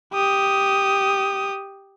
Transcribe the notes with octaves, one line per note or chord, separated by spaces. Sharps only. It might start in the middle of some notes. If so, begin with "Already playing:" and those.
G4 D#6